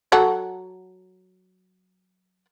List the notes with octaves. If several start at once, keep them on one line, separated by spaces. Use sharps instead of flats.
F#3 A4 F#5